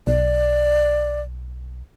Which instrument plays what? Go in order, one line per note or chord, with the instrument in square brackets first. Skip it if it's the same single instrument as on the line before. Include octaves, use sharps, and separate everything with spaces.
[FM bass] B1 [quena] D5